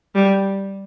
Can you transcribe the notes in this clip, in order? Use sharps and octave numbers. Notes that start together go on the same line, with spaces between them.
G3